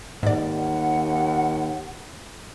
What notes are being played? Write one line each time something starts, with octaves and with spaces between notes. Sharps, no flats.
D#2 G#2 D5 F#5